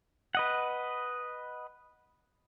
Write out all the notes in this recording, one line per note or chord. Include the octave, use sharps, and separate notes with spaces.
B4 D#5 F#5